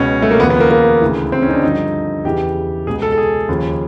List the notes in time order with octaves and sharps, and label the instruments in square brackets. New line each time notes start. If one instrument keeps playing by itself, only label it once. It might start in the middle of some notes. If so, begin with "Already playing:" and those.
Already playing: [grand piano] C#2 B2 C#4
A3
A#3
D#2 C#3 F3 B3
B3
A#3
A#3
D2 C#3 E3
C4
C#4
D#4
D4
G2 D3 F3 D#4
E2 C#3 E3 G4
C#2 B2 G#4
A4
A4
G#4
D#2 C#3 F3